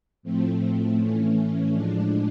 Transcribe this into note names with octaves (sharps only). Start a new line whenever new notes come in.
A2 F3 A3 C4
A2 E3 A3 C#4
C#4
A2 F3 G#3 D4